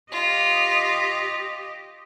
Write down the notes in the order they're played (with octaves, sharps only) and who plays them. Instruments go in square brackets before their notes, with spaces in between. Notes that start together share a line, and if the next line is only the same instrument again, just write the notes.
[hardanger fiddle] F4 [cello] G4 D#5